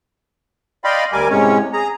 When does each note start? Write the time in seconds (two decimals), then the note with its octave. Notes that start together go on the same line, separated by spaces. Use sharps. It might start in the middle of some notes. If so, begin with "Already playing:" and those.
0.84 D5 D#5 F5 G5 B5 C6
1.13 D2 G3 A#4 G#5 D6
1.30 A2 C3 G#3 C#4 C#5
1.73 G#4 A#5